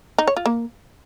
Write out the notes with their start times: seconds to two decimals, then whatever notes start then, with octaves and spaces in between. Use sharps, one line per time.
0.18 D#4
0.27 C#5
0.37 F4
0.46 A#3